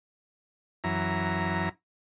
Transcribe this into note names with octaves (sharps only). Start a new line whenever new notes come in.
F#2 E3 A#5